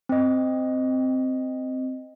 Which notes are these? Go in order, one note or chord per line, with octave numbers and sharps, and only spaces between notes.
C4 D#5